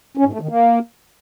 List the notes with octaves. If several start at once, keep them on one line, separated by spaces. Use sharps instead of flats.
C#4
G#2
A3
D#3
A#3